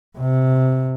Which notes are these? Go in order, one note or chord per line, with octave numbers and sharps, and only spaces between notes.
C3